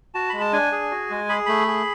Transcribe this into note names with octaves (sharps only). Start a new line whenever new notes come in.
F#4 A5
G#3 B5
A5
D4 G#5
G#4
F#4
G#3
G#4 B5
A3 B5
G#4